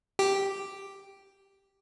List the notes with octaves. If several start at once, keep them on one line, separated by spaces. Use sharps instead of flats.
G4